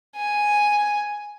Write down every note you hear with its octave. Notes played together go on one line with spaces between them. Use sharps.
G#5